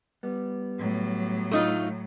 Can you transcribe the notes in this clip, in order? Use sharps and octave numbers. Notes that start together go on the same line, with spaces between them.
G3 B3
A2 F#3
A3 D#4 F4